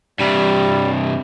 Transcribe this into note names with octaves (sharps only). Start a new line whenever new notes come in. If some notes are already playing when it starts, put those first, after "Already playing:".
G2 C3 G3